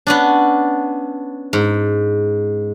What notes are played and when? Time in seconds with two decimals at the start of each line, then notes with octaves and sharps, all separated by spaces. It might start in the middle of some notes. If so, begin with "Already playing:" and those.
0.07 B3 C#4 D4
1.53 G#2